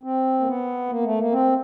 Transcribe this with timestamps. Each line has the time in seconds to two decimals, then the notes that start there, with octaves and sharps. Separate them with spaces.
0.03 C4
0.40 A#3
0.46 B3
0.89 A#3
1.04 A3
1.19 A#3
1.32 C4